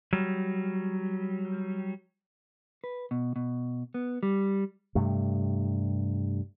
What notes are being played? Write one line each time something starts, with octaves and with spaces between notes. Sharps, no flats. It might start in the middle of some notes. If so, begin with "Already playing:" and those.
F#3 G3
B4
B2
B2
B3
G3
G2 C3 A3